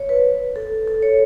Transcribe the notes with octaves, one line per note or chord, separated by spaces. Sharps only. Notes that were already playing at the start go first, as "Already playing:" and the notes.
Already playing: C#5
B4
A4
A4
C#5